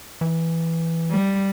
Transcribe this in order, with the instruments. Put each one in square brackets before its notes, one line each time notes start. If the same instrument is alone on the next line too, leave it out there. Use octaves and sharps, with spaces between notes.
[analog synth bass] E3
[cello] G3